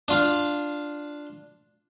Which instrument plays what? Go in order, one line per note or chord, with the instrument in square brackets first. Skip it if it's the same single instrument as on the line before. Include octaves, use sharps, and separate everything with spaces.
[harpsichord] D4 F4 F5